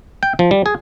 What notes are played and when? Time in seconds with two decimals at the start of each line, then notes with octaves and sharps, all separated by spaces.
0.23 G5
0.39 F3
0.51 G3
0.66 G#4